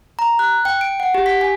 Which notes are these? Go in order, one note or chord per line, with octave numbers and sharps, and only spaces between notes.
A#5
F#6
G5
D7
F#5
G4
B6
G#5